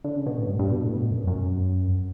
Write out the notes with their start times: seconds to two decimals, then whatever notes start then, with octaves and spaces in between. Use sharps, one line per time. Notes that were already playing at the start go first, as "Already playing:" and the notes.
0.04 D3
0.16 C#3
0.26 B2
0.38 A2
0.47 G2
0.59 G2
0.72 B2
0.84 A2
0.96 B2
1.11 F#2
1.27 F#2